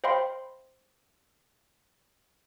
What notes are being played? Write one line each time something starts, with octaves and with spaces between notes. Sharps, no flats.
C5 D#5 F5 G5 B5 C6